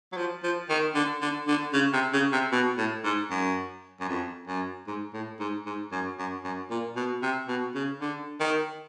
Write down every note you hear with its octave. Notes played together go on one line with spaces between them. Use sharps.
F#3
F3
F3
D#3
D3
D3
D3
C#3
C3
C#3
C3
B2
A2
G#2
F#2
F#2
F2
F#2
G#2
A2
G#2
G#2
F#2
F#2
F#2
A#2
B2
C3
B2
C#3
D3
D#3